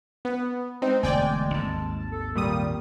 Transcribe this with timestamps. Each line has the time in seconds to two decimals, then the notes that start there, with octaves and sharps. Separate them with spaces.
0.25 B3
0.82 G#3 C4 D#4
1.03 E1 D2 D5 G5 G#5
1.54 G#1 D#2 A5
2.11 A4
2.36 A#2 D#3 G3 D#6